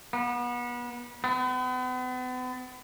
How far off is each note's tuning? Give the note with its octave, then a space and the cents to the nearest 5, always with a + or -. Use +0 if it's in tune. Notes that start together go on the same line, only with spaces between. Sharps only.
B3 -30
B3 +40